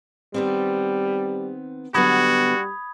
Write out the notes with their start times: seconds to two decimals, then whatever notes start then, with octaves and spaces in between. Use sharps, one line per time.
0.34 D#3 G3 B3 C4
1.94 D3 F#3 G3 B3 F#4 B5 D#6 G#6